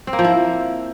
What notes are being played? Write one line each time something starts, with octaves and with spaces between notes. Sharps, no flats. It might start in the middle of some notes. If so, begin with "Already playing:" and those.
C4
A#3
F3
E4